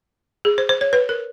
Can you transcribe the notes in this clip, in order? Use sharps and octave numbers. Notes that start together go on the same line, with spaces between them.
G#4
C5
C5
C#5
B4
A#4